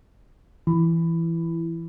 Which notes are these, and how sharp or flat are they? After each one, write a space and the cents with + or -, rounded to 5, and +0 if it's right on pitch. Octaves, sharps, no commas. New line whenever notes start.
E3 +10